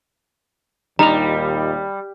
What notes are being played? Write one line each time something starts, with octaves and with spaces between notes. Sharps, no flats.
D#2 A#2 G3 D#4 A#5 F7